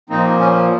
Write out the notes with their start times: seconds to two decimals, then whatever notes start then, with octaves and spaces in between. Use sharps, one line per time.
0.09 A#2 F3 A#3 C4 D#4
0.39 C#4